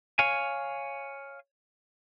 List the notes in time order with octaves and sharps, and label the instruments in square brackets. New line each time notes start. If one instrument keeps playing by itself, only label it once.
[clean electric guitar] C#5 F5 G#5